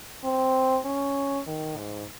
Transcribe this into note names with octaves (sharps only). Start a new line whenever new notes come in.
C4
C#4
D#3
G#2